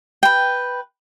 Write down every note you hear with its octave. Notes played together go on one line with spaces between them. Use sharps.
B4 G5